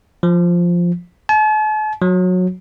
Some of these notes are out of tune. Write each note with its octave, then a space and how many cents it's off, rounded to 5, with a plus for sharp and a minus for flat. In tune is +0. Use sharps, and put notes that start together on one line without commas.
F3 +0
A5 -45
F#3 -20